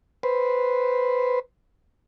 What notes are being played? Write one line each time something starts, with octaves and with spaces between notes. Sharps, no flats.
B4 C5